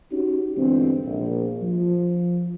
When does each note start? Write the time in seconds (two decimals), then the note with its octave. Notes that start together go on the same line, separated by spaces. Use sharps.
0.12 C#4 D#4 F#4 G4
0.56 G2 B2 D3 E3 G#3 C4
1.06 A#1
1.62 F3